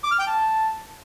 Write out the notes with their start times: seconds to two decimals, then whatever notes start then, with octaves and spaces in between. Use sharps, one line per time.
0.03 D6
0.11 F6
0.19 G5
0.27 A5